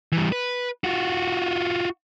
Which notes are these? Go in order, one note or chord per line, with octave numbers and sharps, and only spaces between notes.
E3 G3
B4
F4 F#4